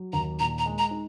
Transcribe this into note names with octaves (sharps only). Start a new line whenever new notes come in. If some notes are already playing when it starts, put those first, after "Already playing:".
Already playing: F#3
D#2 A#5
A#2 A#5
A#5
G#3
A#5
D#4